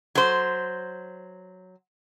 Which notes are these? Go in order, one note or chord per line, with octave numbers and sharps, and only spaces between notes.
F#3 C5